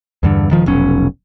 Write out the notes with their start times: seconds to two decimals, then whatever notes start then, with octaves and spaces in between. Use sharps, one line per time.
0.23 E2 G2 D3
0.50 E1 D#3 F3
0.66 F1 B1 C#4